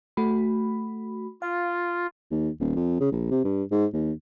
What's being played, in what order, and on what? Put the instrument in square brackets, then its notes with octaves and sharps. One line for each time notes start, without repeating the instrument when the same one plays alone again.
[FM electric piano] A3 F#4 B5
[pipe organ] F4 [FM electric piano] F5
[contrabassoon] D#2
D#1
F2
C#3
A#1
C3
G2
G#2
D#2